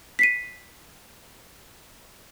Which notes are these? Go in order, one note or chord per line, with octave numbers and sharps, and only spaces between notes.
B6 C7 D#7